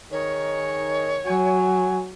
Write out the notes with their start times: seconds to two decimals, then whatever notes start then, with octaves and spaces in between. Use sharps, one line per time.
0.11 D#3 D#4 G#4 C#5
1.26 F#3 G#5